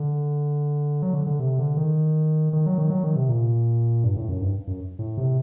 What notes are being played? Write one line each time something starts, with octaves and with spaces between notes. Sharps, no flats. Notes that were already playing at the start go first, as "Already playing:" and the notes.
Already playing: D3
F#3
D3
D3
C3
D3
D#3
D#3
F#3
D#3
F#3
D#3
C3
A#2
G2
A2
F#2
G2
F#2
A2
C3